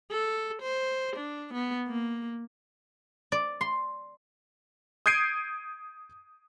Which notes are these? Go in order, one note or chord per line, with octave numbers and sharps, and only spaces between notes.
A4
C5
D4
B3
A#3
D5
C6
D#6 G6 G#6 C7 D7 D#7